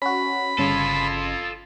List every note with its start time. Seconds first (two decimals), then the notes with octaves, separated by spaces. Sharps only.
0.02 C#4 F#4 B5
0.58 G1 C#3 F4 A4 C6